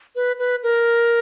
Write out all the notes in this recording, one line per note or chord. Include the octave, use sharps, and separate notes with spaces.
B4
B4
A#4